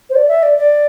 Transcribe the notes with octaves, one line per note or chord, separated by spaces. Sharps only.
C5
D5
E5
D5
D5